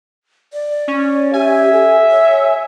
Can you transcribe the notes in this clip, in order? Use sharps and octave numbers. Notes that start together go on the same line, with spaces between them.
D5
C#4
G4 E5 G#5
A4
C#5